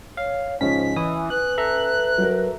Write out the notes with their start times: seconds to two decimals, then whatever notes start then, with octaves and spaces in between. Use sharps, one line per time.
0.17 C#5 F5
0.61 G#2 C#3 F3 C#4 D#5 B6
0.97 E3 D#6
1.30 B4 F#6
1.58 A4 E5 A#5
2.18 F#3 A#4